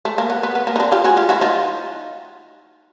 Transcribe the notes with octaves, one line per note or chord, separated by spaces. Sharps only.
A3
A#3
B3
B3
B3
A#3
D#4
C4 D4
F4 G4
F#4 G#4
F4 G4
E4 F#4
D#4 F4